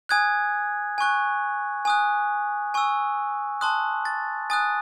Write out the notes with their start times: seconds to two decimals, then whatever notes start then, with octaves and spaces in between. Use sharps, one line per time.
0.09 G#5 D#6 F#6 G#6
0.98 G#5 C#6 F#6
1.85 G#5 D#6 F#6
2.74 G#5 C#6 E6
3.61 A5 C6 D#6 F#6
4.05 A6
4.50 G#5 D#6 F#6 A6